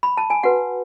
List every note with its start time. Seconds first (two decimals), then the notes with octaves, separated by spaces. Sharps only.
0.03 B5
0.17 A5
0.30 G#5
0.43 F#4 B4 F#5